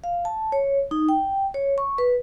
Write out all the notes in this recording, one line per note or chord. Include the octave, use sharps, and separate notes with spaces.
F5
A5
C#5
D#4
G5
C#5
C#6
B4